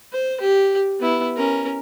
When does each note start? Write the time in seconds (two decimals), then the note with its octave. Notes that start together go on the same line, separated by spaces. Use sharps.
0.12 C5
0.41 G4
0.99 B3 E4
1.36 C#4 A#4